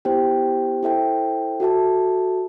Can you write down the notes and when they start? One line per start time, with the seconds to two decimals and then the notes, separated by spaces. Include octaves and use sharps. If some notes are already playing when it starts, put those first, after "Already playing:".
0.05 B3 E4 G4 C5 G5
0.83 E4 A4 C5 E5 G5
1.60 F#4 A4 E5 A5